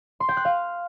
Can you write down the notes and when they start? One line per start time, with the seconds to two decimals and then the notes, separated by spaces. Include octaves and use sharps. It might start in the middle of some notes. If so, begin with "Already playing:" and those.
0.20 C6
0.29 G5
0.37 F#6
0.45 F5